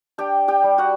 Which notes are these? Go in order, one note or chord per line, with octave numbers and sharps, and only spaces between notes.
D4 G4 G5
G4 G5
G3
F#4 F#5